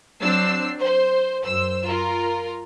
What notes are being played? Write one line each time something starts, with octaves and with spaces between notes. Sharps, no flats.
F#3 C4 D4 E6 C7
C5
F#2 C5 E6
F4 A#4